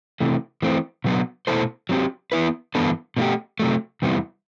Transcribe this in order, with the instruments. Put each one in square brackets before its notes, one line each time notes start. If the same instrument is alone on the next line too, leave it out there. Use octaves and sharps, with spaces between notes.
[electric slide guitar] C3 E3 A3
E3 A3 C4
B2 F#3 B3 D4
B2 A3 E4 A4 C5
F#3 C4 G4
E3 B3 E4 B4
G2 E3 B3 D4 A4
B2 A3 E4 G4
C3 F#3 A3
E2 C3 G3 B3 E4